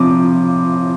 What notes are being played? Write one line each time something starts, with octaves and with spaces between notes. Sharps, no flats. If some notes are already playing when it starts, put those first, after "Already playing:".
Already playing: C3 F3 D6